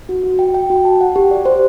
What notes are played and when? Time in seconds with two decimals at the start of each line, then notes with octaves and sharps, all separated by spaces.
0.09 F#4
0.24 F#4
0.39 G5
0.54 G5
0.70 F#4
0.85 A5
1.01 F#5
1.16 G4
1.31 D5
1.45 C5